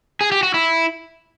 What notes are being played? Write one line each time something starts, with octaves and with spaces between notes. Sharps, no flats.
G#4
G4
F#4
E4